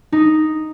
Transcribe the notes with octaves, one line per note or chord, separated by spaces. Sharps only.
D#4